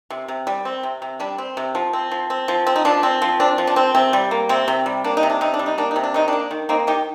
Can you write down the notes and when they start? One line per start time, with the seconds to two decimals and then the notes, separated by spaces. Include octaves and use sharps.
0.10 C3
0.28 C3
0.47 G3
0.65 C4
0.83 C3
1.02 C3
1.19 G3 D4
1.38 C4
1.57 C3
1.75 F3
1.93 C4
2.11 F3
2.30 C4
2.48 F3
2.67 C4
2.76 D#4
2.85 F3 D4
3.03 C4
3.22 F3
3.40 C4 D4
3.58 F3
3.67 D4
3.76 C4
3.95 C3 C4
4.13 G3
4.31 A#3
4.49 C3 C4
4.68 C3
4.86 G3
5.04 A#3 D4
5.17 D#4
5.23 C3
5.30 D4
5.41 C3 D#4
5.54 D4
5.59 G3
5.66 D#4
5.78 A#3 D4
5.91 D#4
5.96 C3
6.03 D4
6.14 D#3 D#4
6.28 A#3 D4
6.51 D#3
6.69 A#3 C4 D#4
6.87 D#3 D#4 G4